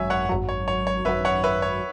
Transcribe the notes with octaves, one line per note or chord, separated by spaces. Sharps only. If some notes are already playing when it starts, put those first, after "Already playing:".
Already playing: G#1 F#2 F#3 C#5 E5 G#5
C#5 F#5
G#1 F#2 F#3
C#5
C#5
C#5
G#1 F#2 F#3 B4 E5
C#5 F#5
B4 E5
C#5